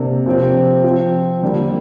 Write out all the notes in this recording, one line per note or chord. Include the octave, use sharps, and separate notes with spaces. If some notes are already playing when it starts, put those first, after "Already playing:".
Already playing: C3 A#3 D4
C3 F3 C4
F3 C4
D3 G3 A#3 D4